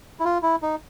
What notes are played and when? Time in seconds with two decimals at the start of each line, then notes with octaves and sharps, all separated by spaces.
0.20 E4
0.25 F4
0.43 E4
0.62 D#4